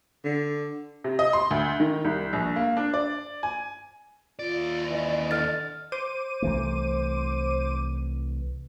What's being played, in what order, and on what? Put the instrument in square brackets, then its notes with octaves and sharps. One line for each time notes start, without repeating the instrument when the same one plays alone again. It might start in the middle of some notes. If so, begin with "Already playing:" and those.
[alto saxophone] D3
[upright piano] C3
D#5
C6
D2
D#3
C2
A#1
A#3
D4
D5
G#5
[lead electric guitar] D#2 D5 [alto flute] F4
[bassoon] E3 [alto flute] D#5
[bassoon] D3 [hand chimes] F6 A6
[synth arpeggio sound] C5 D6 D#7
[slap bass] C2 E3 A3